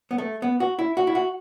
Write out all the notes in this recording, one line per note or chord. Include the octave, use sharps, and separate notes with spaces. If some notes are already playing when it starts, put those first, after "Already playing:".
B3
A3
B3
F#4
E4
F#4
E4
F#4